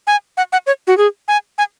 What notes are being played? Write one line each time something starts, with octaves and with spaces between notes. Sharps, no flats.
G#5
F#5
F#5
C#5
F#4
G#4
G#5
G#5